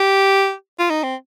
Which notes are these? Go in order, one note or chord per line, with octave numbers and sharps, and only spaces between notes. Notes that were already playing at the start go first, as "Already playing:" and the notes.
Already playing: G4
F4
D#4
C4